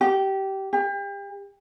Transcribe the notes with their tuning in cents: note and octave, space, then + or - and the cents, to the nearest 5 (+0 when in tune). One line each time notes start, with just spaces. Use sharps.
G4 -20
G4 +35